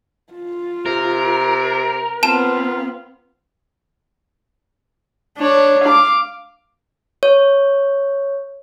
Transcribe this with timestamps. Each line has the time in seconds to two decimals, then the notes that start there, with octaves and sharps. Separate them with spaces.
0.33 F4
0.86 C3 A#4
2.23 B3 C4 F4 A5 E7
5.38 D4 C#5
5.85 F5 D6
7.23 C#5